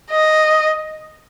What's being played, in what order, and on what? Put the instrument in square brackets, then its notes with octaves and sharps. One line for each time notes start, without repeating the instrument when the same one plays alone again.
[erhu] D#5